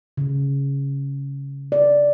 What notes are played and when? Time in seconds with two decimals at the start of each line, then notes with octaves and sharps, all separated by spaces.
0.17 C#3
1.72 D5